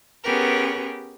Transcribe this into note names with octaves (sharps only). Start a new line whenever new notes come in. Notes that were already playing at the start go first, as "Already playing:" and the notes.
B3 C#4 G4 G#4 A#4 B4